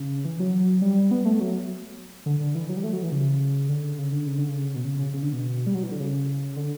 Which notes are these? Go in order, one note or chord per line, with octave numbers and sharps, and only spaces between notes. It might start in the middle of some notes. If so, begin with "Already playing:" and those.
Already playing: C#3
E3
F#3
G3
B3
A3
F#3
D3
D3
E3
F#3
G3
A3
F#3
E3
C#3
D3
C#3
D3
C#3
D3
C#3
B2
C#3
C#3
C#3
D3
B2
G3
F#3
E3
D3
C#3
D3